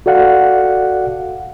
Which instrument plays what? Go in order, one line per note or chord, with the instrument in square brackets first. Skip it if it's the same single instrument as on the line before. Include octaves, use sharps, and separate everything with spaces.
[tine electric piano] F#4 A4 D5 F5 F#5